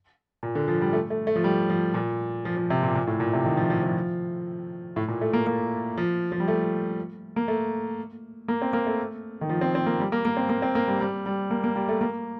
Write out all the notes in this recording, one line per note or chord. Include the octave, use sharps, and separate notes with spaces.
A#2
D3
F3
G3
A3
A3
A3
F3
G3
F3
A#2
F3
F3
C3
A#2
A#2
A2
A#2
C3
D#3
F3
F3
F3
A2
A#2
A3
A#3
A#3
F3
F3
G3
A3
A#3
A3
A#3
C4
A#3
A3
D#3
F3
C4
C4
A#3
G3
A#3
A#3
C4
A#3
C4
A#3
G3
G3
G3
A#3
A#3
G3
A3
A#3